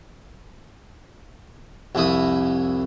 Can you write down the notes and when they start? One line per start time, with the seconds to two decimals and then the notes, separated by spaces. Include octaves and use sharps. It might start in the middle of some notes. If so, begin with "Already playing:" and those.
1.95 C2 F2 E4 D#6